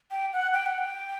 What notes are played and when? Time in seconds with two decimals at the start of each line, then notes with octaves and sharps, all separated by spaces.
0.11 G5
0.33 F#5
0.53 G5
0.66 F#5
0.78 G5